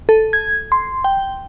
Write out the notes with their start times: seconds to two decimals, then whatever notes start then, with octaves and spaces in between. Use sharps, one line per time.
0.09 A4
0.33 G#6
0.72 C6
1.04 G5